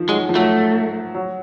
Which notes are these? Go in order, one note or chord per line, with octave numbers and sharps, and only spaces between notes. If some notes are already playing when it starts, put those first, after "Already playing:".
Already playing: D#3 F3
F#3 G#3
F3
F#3 A3
F#3